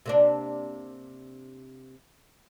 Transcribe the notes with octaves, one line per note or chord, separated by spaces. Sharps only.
C3 A#3 D4